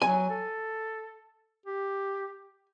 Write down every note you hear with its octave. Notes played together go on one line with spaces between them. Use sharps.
F#3 G#5
A4
G4